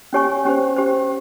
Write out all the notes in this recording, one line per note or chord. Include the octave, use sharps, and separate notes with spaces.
C#4 G4 C#5 G#5 C#6
C#4 G4 C5
C#4 G4 C5